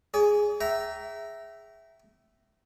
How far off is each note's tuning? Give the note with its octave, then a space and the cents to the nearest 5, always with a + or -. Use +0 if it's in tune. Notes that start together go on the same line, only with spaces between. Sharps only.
G#4 +0 D5 -45
E5 +0 G5 -35 A#5 +0